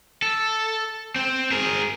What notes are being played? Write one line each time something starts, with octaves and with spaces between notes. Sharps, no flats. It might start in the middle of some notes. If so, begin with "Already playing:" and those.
A4
C4
G#4 A#4